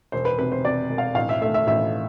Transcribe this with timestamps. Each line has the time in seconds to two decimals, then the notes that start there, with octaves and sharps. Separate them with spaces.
0.12 E1 C5
0.25 B4
0.39 C3 B4
0.52 C5
0.65 C3 D5
0.89 E1
0.98 F5
1.15 A1 F5
1.29 E5
1.41 A3 E5
1.54 E5
1.67 A1 E5